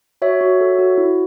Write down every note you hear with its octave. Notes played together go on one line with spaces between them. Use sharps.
F#4 C#5 E5
F#4
A4
F#4
E4